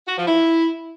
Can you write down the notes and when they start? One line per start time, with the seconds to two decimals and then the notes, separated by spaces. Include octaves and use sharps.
0.07 F#4
0.16 F3
0.26 E4